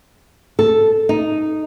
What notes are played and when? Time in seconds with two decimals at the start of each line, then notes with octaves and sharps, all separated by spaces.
0.59 A4
1.09 D#4